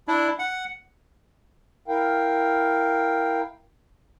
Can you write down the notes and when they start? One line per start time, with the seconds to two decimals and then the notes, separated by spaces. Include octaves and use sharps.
0.08 D4 E4
0.39 F#5
1.88 E4 A#4 F5 G5